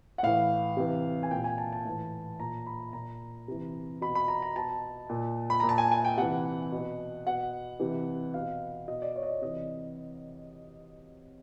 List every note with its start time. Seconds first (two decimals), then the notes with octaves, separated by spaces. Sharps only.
0.18 F#5
0.23 A2 E3 F5
0.77 C3 E3
1.23 G#5
1.31 A#2 G5
1.44 G#5
1.58 A5
1.73 A5
1.85 A2 E3
2.40 A#2 A#5
2.67 B5
2.93 A#2 A#5
3.48 C3 E3
4.01 B2 B5
4.15 B5
4.28 A#5
4.42 A#5
4.56 B2 A5
5.09 A#2
5.50 B5
5.60 A#2 A#5
5.69 A5
5.78 G#5
5.92 G#5
6.05 G5
6.17 C3 E3 F#5
6.72 B2
7.27 B2 F#5
7.80 C3 E3
8.34 B2 F5
8.88 B2 D#5
9.02 D5
9.16 C#5
9.23 D#5
9.29 D5
9.42 C3 E3 D#5